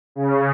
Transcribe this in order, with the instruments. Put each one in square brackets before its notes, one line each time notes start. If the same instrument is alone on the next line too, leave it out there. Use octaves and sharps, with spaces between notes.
[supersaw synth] C#3